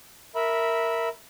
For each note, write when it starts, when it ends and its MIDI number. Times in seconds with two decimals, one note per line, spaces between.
0.35 1.09 70
0.35 1.09 76
0.35 1.09 83